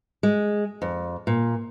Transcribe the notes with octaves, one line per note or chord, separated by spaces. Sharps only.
G#3
F2
A#2